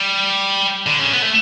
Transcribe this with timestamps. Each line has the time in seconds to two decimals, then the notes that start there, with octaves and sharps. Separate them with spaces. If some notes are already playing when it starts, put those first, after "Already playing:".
Already playing: G3
0.86 D3
0.99 C#3
1.13 B3
1.22 A3